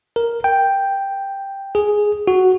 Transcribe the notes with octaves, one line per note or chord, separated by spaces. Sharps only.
A#4
G5
G#4
F#4